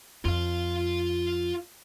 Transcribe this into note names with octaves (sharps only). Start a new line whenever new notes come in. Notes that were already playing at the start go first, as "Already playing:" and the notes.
F2 F4 F5